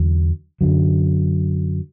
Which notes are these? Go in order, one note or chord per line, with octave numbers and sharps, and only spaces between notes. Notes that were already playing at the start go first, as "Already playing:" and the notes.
Already playing: E2 D3 F#3
F#2 D3 F#3